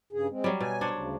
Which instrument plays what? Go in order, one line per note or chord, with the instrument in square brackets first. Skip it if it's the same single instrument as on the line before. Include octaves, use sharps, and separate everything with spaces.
[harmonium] G2 C#3 G#4
G#3 C4
[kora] F#3 G3
[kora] B2 [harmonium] G#5
[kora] D4 C5 C#5
[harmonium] D2 C#3